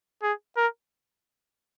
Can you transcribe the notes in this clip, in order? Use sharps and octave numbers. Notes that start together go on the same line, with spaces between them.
G#4
A#4